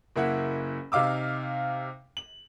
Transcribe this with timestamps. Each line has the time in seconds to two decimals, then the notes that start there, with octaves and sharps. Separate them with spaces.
0.16 F#1 A#3 E4 E5 F#5
0.92 C3 D#4 F5 D6 E6
2.17 F#7